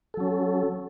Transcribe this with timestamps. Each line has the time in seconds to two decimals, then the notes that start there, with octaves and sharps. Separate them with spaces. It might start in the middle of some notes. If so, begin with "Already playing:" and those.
0.14 A4
0.17 F#3
0.20 C#4